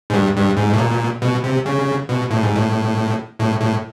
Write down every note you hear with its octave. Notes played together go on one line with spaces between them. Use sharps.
G#2
G2
G2
G#2
A2
A#2
B2
C3
C#3
B2
A2
G#2
A2
A2
A2